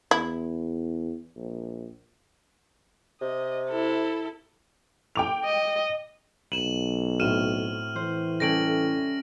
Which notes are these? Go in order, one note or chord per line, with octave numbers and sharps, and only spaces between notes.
E2 E4
A#1
C3 D#5
E4 A4
G5 D6 F7
D#5
B1 D#7 E7 F#7
A2 C4 F#4 F6 D#7 E7
E3 C5
G3 A3 C#4 A#6 D7 F#7